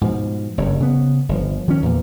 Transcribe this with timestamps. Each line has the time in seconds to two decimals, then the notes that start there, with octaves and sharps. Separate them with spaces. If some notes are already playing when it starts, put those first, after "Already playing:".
0.01 G#2 B2 F3
0.58 F#1 G2 C#3
0.80 C#3 B3
1.29 G1 F3
1.68 D#3 F3 C#4
1.82 E2 A#2